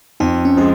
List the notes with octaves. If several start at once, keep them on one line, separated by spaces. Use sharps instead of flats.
F2 D#4
C#4
F3 G#3 F4